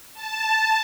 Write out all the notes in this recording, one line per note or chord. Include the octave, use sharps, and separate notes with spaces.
A5